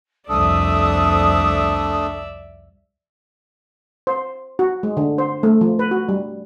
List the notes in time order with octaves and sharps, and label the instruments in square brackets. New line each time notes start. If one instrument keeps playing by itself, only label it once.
[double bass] C2 F2 [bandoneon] A3 D4 A4 [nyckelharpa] D5 E5 [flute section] D#6
[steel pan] C5
F#4
G#3
D3
C5
A3
F3
B4
F#4
G3